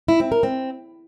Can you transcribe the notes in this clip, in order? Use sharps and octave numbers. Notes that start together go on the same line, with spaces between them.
E4
C4
A#4
C4